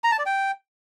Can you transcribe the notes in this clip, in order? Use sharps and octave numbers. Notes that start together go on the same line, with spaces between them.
A#5
A5
D5
G5